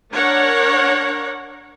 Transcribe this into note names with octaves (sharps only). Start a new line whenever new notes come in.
D4 A#4 C#5 F#5